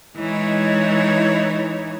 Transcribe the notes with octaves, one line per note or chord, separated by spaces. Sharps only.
E3 G#3 D#4 E4 C#5